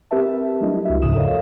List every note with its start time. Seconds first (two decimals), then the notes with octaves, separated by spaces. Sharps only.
0.11 C4 G4 A#4 B4 E5 A5
0.61 F#3 G3 A3 D4 E4 D#5
0.85 C#2 F#4 E5
1.02 E2 G#2 C#3 F3 D#6 E7
1.15 A4 A#4 C#5 D#5 F5